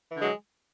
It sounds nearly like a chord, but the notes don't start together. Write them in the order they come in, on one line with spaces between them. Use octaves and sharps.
E3 D3 G#3 F#3